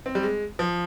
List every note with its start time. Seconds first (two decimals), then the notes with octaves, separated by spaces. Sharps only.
0.06 C4
0.15 G3
0.23 G#3
0.59 F3